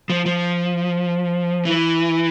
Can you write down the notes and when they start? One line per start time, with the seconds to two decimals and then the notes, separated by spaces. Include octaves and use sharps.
0.10 F3
0.26 F3
1.65 E3